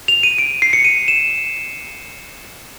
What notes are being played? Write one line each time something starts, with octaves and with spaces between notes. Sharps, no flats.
F7
D#7
D7
C7
C#7
D#7
E7